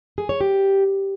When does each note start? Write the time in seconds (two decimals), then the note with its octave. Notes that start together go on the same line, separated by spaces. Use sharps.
0.18 G#4
0.29 C#5
0.41 G4